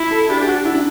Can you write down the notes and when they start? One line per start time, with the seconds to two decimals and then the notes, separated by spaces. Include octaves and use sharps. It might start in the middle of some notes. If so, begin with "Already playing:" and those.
Already playing: E4
0.11 A4
0.29 D4 G4
0.42 G4
0.47 F#4
0.65 E4
0.74 D4